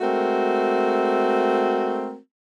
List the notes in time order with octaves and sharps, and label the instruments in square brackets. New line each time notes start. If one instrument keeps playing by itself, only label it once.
[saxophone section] G#3 A3 C4 F#4 A#4